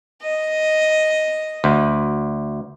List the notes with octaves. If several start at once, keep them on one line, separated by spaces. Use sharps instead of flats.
D#5
D2